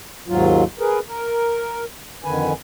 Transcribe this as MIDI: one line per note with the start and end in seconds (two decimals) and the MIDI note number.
0.28 0.64 39
0.28 0.64 44
0.28 0.64 54
0.28 0.64 65
0.79 0.99 68
0.79 0.99 70
0.79 0.99 71
1.08 1.84 70
2.24 2.53 41
2.24 2.53 50
2.24 2.53 51
2.24 2.53 71
2.24 2.53 80